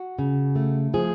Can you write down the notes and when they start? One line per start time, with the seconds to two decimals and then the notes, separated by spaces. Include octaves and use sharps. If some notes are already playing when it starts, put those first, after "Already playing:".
Already playing: F#4
0.19 C#3
0.56 A3
0.94 F3 G#4